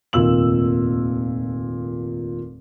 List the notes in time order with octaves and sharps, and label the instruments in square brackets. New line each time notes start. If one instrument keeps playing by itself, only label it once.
[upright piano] F1 D#2 A#2 E6 F#7